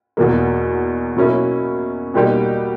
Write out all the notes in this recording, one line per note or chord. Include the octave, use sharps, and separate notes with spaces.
E2 B2 F#3 A#3
B2 F#3 A#3 C#4 E4
B2 G3 A#3 D#4 G4